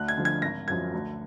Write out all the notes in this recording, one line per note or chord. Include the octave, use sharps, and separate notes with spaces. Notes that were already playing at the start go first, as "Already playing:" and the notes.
Already playing: D2 F#6
G#6
D3 F3
G#6
G#1 A#6
F#2 F3 G#6
D2